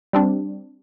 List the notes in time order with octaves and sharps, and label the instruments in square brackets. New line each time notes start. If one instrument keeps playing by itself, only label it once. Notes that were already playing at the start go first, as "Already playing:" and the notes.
[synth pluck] G3 C4 D4